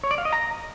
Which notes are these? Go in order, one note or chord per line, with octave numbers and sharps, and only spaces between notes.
C#5
D5
F5
D#5
A#5